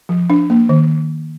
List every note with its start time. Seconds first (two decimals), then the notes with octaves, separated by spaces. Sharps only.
0.09 F3
0.30 D4
0.50 A#3
0.69 D#3